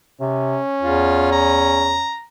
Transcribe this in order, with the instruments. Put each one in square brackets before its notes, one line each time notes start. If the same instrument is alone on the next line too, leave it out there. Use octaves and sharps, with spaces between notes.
[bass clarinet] C3 [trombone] C#4
[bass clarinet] E2 [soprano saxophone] F4
[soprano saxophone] A#5